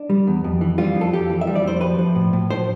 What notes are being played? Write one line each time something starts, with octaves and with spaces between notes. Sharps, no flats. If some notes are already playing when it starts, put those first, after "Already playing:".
Already playing: D4
G3
E2
F2
E3
G3 F4
F2
A4
F2 G4
E3
E5
G3
D5
F2 C5
F3 B4
F3
A2
A2
F3 C5